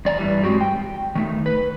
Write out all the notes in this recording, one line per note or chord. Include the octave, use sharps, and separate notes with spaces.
E2 D5 G#5 A#5
G2 E3 G3
G#3 C4 F#4 G4
G5
D#3 A3 D#4
B4